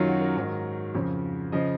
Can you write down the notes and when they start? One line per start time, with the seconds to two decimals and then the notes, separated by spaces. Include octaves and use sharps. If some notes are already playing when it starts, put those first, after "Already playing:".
Already playing: F#2 D#3 F#3 C#4 F4
0.08 F#4
0.21 A#4
0.37 G#2 D#3 F#3
0.95 F2 C#3 F3
1.52 C#3 F3 D#5